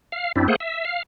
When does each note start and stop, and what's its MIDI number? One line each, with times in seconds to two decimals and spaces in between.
0.12 0.32 77
0.36 0.48 42
0.36 0.48 60
0.36 0.48 62
0.36 0.48 64
0.48 0.56 57
0.48 0.56 58
0.48 0.56 68
0.48 0.56 72
0.48 0.56 78
0.60 0.85 76
0.85 1.03 77